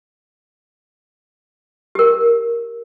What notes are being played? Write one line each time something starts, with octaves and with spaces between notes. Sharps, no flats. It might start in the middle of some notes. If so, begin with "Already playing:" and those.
G4 A#4